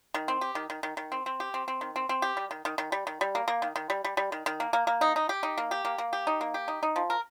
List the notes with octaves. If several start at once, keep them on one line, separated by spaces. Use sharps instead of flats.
D#3
C4
G4
D#3
D#3
D#3
D#3
C4
C4
G4
C4
C4
D#3
C4
C4
G4
G3
D#3
D#3
D#3
G3
D#3
G3
A#3
A#3
D#3
D#3
G3
G3
G3
D#3
D#3
A#3
A#3
A#3
D#4
D#4
G4
D#4
A#3
G4
A#3
A#3
G4
D#4
A#3
G4
D#4
D#4
F3
A#4